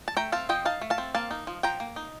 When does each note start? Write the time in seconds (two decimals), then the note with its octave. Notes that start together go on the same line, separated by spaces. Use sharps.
0.08 A5
0.17 A3 G5 A#5
0.32 C4 F5 A5
0.49 F3 D#5 G5
0.65 D#4 F5 A5
0.81 A3
0.90 F5 A5
0.98 C4
1.15 A#3 F5 A5
1.31 D#4
1.47 F3
1.63 F3 G5 A#5
1.80 A#3
1.96 D#4